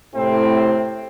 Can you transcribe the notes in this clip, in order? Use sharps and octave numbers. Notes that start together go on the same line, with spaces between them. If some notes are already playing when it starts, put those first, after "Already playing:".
A2 C3 C4